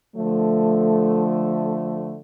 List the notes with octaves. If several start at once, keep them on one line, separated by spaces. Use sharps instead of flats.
D3 F3 A3